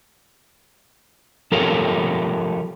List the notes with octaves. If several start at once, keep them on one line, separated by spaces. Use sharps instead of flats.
F3 F4 G4 A4 A#4 C#5